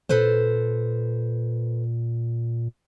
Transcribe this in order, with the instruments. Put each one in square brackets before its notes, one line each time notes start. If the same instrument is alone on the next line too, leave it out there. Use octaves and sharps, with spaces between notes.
[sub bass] A#2 [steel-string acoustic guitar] A4 B4 C5